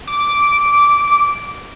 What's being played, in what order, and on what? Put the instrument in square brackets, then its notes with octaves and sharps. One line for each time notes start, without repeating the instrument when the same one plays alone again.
[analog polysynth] D6 D7